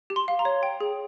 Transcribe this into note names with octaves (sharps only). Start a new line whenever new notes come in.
G4
C6
F5
A#5
C#5
G5
G#4